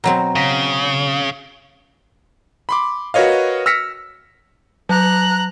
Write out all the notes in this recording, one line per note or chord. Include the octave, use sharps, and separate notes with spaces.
B2 F#3 C4 A#5
C#3 A#6 B6
B5 C6 D6
F#4 A#4 B4 C#5 D#5 F5
E6 F6 A#6 B6 C#7
F#3 A#5 F#6